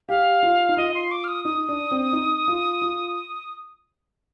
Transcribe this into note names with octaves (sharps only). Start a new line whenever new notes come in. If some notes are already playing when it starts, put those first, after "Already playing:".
G4 F5
F4
D#4
F4 D#5
C6
D6
F6
D#6
D#4 D#6
D4
C4
D#4
F4
F4